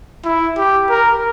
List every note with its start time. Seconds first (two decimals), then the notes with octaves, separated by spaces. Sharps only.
0.25 E4
0.57 G4
0.90 A#4